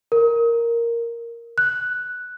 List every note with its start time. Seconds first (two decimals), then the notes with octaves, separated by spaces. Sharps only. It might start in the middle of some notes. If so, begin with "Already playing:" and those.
0.12 A#4
1.58 F#6